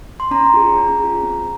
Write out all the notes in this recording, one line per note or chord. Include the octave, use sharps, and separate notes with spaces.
C6
C#4 A#5
F4 G#4
C#4
F4 G#4
C4